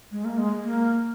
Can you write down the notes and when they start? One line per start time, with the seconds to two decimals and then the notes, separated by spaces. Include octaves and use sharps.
0.12 G#3
0.25 A#3
0.38 G#3
0.63 A#3